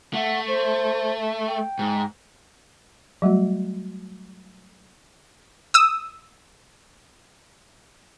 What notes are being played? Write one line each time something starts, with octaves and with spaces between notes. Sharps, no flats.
A3 F#5
C5
G5
G#2
F#3 G3 A3 F#4
D#6 E6